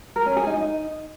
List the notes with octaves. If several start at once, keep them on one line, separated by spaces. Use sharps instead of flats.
A#4
C#4
G#4
D#4
D#4